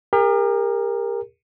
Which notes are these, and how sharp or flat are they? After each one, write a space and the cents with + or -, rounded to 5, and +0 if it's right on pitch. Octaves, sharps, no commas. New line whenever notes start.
G4 +45 A#4 +0